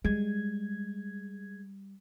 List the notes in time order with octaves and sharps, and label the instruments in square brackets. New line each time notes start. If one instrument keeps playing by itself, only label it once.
[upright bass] G3 [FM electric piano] G#3 G#6